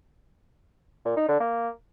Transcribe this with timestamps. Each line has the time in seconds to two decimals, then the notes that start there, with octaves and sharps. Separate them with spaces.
1.05 A#2
1.17 D#4
1.29 D3
1.40 A#3